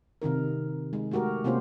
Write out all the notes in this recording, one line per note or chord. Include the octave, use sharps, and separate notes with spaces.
C3 D#3 D#4 A#4
G#3 D#4
G#3 A3 F#4 G4 A#4
C3 A#3 C#4 F4 G4 C5